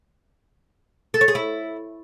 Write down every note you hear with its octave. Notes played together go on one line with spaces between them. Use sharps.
A4
C#5
G#4
E4